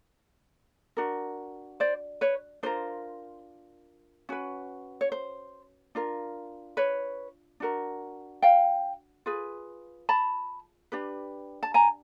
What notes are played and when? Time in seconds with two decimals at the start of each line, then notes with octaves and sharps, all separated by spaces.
0.97 D4 F#4 A#4
1.80 C5 D5
2.21 B4 C#5
2.63 D4 F4 A#4 C5
4.29 C#4 F#4 B4
5.01 C#5
5.12 C5
5.95 D4 F4 A#4
6.77 B4 C#5
7.60 D4 F#4 A#4
8.42 F5 G5
9.26 F4 G#4 B4
10.09 A5 B5
10.92 D4 G4 B4
11.63 A5
11.74 G#5 A#5